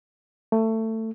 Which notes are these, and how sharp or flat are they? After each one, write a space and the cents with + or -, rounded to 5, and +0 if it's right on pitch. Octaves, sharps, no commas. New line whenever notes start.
A3 +20